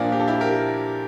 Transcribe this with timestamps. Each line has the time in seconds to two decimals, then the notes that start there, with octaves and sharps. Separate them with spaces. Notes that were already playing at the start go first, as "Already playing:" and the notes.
Already playing: A#2 F3 A#3 D4 F4
0.12 G4
0.20 A4
0.27 E4 G4
0.41 G4 A#4